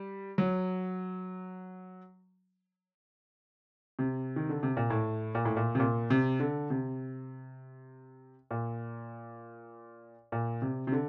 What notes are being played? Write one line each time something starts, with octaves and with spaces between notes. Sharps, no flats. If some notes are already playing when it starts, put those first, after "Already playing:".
Already playing: G3
F#3
C3
D#3
D3
C3
A#2
A2
A#2
A2
A#2
C3
A#2
C3
D3
C3
A#2
A#2
C3
C3
D3